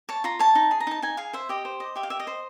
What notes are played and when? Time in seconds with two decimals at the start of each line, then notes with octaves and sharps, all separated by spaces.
0.09 C#5 A5
0.24 F4 A#5
0.39 C#5 A5
0.55 D#4
0.71 G#4
0.80 A#5
0.87 D#4 A5
1.02 D#4 G#5
1.17 G#4 F5
1.33 C5 E5
1.49 G4 D#5
1.65 C5
1.80 D#5
1.96 G4 E5
2.03 F5
2.10 G4 E5
2.20 D#5
2.27 C5